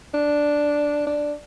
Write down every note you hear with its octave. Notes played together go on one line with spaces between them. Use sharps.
D4
D4